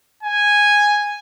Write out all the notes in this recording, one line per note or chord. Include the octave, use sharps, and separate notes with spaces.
G#5